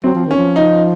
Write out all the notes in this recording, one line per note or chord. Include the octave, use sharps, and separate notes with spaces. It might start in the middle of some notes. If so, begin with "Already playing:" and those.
F#3 C4
F3
D#3 C#4
F3
D#4